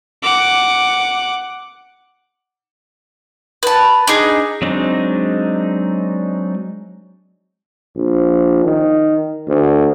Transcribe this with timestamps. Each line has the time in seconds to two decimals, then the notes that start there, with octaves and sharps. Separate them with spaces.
0.23 F#5 D6
3.63 B4 A5
4.07 D4 D#4 G#4
4.62 F#3 G#3 C4 D4 D#4
7.96 A#1
8.64 D#3
9.48 D2